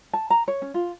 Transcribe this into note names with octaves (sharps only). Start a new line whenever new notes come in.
A5
A#5
C#5
C#4
F4